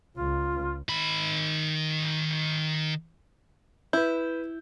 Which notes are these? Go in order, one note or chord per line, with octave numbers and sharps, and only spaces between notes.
C#2 F4
D#3 B5
E4 B4 G6